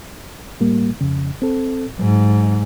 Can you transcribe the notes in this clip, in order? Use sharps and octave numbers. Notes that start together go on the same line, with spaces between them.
A2 G3 A#3
F2 C#3
C4 A4
G#2 F#3